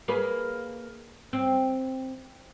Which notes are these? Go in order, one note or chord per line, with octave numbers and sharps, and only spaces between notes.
A#3 G#4 B4
C4